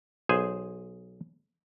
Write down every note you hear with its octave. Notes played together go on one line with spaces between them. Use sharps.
B1 G#4 C5 G#5